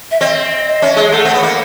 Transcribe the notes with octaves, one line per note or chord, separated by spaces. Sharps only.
E5
C4 D#5
C#4 E5
G#3
A3 F#5
C4
B3
A#3